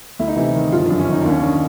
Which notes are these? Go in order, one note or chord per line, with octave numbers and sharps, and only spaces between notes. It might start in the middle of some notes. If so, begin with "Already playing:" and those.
D2 E4
D#4
C3 E3 E4
D#3
G1 F3 F4
D4
F#2
C#4
D#3 D#4
D4
D#2 C#4
D#3 D4